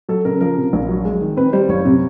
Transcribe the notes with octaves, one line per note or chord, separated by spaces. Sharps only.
F#3 A4
C#3 A#4
F3 A#4
C3
A#1
F#3
G#3
D#3
C4 B4
G3 C5
F#1 C#5
C3